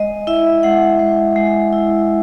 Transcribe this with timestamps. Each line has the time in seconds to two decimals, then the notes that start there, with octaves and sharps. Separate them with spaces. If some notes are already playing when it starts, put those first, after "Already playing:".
Already playing: G#3 D#5
0.27 E4 E5
0.63 G#3 F#5
0.99 G#3
1.36 G#3
1.73 E4